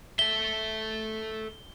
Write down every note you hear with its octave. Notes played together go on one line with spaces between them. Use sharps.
A4 E5 G7